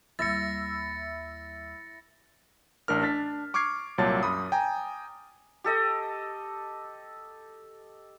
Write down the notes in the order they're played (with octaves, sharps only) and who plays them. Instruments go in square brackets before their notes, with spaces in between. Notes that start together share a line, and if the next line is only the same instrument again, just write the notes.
[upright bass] D#2 G3 [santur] E4 E5 [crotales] A6 A#6 C#7
[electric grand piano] A1 D4 A#4 F6
D4 A6 B6
C#6 D6 F6 G#6 C7
C2 A#2 F#3 C#5 A5 A6
F#2 B5 D#6
G5 G#5 A#5
[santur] G4 A4 D#5